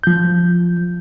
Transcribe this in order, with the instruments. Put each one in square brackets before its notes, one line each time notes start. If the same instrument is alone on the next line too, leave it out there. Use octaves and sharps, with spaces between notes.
[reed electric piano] F3 G6